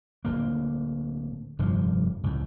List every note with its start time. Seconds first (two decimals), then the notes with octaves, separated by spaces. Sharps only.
0.25 D1 D3 A#3
1.59 F1 G2 D3 F3
2.24 C#2 A2